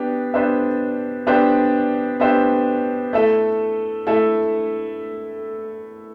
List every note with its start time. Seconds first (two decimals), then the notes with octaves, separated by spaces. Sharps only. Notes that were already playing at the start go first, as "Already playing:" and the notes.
Already playing: B3 D4 G4
0.34 B3 D4 G4 C5 E5
1.27 B3 D4 G4 C5 E5
2.20 B3 D4 G4 C5 E5
3.13 A3 E4 A4 E5
4.07 A3 E4 A4 E5